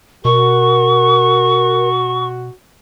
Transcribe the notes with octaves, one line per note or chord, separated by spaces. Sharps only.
B2 F#4 A#4 C#6